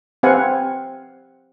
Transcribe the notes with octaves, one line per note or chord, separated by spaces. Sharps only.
C4 G4 B4 F5 F#5 G#5